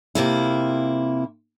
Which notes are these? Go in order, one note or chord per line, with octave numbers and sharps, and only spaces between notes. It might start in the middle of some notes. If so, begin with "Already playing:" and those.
F2 C3 A#3 E4